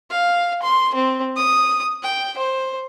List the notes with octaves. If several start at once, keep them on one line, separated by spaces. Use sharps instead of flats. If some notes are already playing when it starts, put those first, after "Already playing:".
F5
C6
C4
D#6
G5
C5